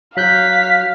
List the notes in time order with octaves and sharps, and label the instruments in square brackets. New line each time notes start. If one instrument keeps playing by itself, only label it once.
[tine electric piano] F#3 F#6 G6 [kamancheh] F5 [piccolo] B6